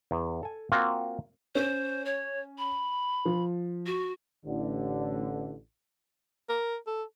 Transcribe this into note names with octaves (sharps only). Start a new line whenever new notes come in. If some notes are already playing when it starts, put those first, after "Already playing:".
E2
A4 G#5
A#3 C4 F4 F#4
C#4 C5
C#5
B5
F3
F#4
A1 D3
A#4
A4